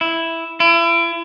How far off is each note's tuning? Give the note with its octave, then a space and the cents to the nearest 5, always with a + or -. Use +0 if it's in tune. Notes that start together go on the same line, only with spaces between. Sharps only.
E4 +0
E4 +35